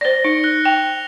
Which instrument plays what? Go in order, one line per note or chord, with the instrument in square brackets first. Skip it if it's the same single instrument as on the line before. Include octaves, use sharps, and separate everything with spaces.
[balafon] C5 D5 [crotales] A#6 G7
[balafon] D#4 [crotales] C#7
[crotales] F#6 A#6 G7
[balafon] G5 [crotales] F7